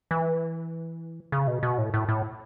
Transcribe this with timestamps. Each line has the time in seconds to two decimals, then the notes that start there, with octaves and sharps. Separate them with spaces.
0.11 E3
1.32 C#3
1.47 B2
1.63 B2
1.78 A2
1.94 A2
2.09 A2